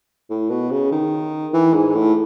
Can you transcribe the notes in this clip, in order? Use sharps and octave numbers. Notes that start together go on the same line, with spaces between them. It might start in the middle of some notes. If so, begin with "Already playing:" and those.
A2
B2
C#3
D#3
E3
G#2
A2